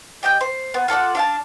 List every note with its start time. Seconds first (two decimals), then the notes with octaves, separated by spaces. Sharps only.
0.23 G4 D#5 G5 G6
0.41 C5
0.74 B3
0.88 F4 A4 D5 F#5
1.15 D4 F5 A5